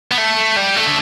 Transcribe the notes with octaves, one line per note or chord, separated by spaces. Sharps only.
B3
A3
G3
A3
D3